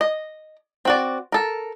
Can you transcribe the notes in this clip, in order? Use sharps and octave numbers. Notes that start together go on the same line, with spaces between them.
D#5
C4 F#4 D5
A4 A#4